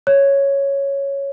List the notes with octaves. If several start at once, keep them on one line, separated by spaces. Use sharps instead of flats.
C#5